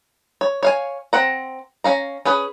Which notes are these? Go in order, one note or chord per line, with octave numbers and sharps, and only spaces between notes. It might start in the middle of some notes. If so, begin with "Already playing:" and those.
C#5
C#5 F5 G#5
C4 F#5 A#5
C#4 F5 A#5
C#4 G#4 B4